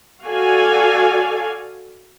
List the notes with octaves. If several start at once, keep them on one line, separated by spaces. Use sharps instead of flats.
F#4 A4 D5 F5 G#5